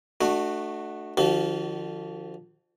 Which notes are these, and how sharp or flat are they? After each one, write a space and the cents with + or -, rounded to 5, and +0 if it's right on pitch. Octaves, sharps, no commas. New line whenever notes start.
A3 +0 D4 +40 F#4 +0
D3 +40 F3 +0 F#4 +45